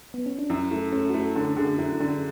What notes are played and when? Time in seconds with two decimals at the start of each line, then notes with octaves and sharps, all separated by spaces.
0.14 B3
0.26 C#4
0.39 D4
0.50 F#2 E4
0.71 A3 E4
0.92 A3 C#4
1.09 F#4
1.14 A3 E4
1.35 D3 A4
1.57 D3 G#4
1.78 F#2 E4
2.00 D3 D4